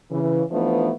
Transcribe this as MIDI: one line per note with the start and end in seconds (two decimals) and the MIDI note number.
0.11 0.42 49
0.11 0.42 52
0.51 0.92 52
0.51 0.92 53
0.51 0.92 57
0.51 0.92 59
0.51 0.92 62
0.51 0.92 63